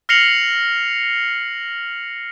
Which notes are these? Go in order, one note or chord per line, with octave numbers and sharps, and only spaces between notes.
F6 A#6 C7 C#7 F7 F#7